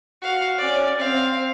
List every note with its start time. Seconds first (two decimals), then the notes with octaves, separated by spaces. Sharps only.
0.21 F#4 F5
0.57 C#4 D5
0.98 C4 F5